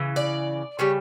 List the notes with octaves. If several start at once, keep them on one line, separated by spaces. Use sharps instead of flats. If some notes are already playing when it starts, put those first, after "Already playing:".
Already playing: C#3 E3
D5
C#3 G3 C#5